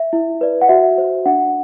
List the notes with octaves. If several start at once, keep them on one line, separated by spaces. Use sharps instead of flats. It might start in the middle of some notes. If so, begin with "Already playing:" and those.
Already playing: E5
E4
B4 D5
F#5
F#4 E5
C5
D4 F#5